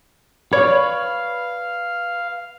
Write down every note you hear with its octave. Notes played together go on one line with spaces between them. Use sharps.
B4 C#5 D5 F5